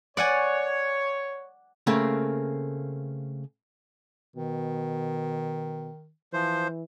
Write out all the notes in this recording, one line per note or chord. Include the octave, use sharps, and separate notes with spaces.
C#5 D5 F#5 G#5
C#3 A3 A#3 C4
B2 D#3
E3 F3 C5